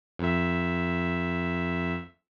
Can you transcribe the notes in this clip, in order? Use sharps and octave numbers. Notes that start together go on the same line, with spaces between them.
F2 E5